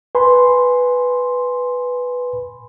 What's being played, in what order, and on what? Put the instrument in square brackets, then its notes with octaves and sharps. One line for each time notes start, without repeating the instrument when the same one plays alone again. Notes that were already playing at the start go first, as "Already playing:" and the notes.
[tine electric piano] B4 G#5 B5 C6